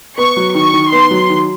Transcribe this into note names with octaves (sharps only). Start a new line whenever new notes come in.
B3 C#6
F#3
D#3 C#6
D#3
B3 C6
F#3
D#3